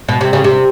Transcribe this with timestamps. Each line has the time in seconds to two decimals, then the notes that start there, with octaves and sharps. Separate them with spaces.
0.09 B2
0.21 C3
0.33 C#3
0.44 C3